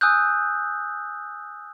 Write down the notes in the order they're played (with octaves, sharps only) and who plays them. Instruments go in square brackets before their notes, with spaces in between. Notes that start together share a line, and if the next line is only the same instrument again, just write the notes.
[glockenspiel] G#5 D#6 E6 F#6 G6